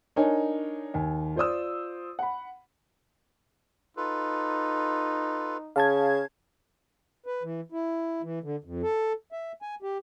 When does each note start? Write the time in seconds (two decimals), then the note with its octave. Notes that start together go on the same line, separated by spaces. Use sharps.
0.16 D4 D#4 A#4 C#5 G#5
0.94 D#2 G#5
1.36 F4 C5 D5 D#6 E6
2.19 F#5 B5
3.97 D#4 F4 A4 B4
5.76 C#3 F5 A5 G#6
7.26 B4
7.43 E3
7.72 E4
8.22 E3
8.43 D3
8.64 F2
8.82 A4
9.32 E5
9.62 G#5
9.82 G4